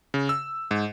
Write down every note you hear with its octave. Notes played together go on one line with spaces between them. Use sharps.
C#3
E6
G#2